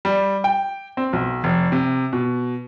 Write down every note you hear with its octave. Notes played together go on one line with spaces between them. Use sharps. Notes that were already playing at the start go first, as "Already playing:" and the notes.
G3
G5
C4
B1
F1
C3
B2